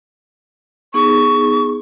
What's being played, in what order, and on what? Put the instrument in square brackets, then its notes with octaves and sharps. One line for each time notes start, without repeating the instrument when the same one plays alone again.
[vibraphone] B3 D#4 G#4 [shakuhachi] C#6